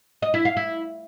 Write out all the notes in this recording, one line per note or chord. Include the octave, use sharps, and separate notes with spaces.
D#5
E4
F5
E4